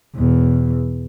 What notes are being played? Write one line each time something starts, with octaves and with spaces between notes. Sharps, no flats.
E2 B2